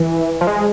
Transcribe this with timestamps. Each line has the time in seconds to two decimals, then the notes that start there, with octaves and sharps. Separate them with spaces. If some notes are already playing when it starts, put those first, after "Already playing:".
Already playing: E3
0.41 F3
0.47 G#3